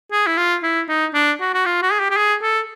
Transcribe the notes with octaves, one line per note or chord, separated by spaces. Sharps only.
G#4
E4
F4
E4
D#4
D4
F#4
F#4
F4
F#4
G#4
G4
G4
G#4
A4